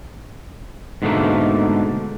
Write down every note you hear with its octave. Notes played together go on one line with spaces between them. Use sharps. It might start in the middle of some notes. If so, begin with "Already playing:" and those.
G#2 B2 D3 E3 A3 A#3